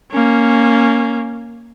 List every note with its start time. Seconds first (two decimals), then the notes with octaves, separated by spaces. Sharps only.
0.12 A#3 C#4